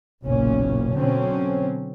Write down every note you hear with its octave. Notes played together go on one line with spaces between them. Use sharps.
F#1 B1 A#2 C#4
B2 D3 F#3 C4 C#4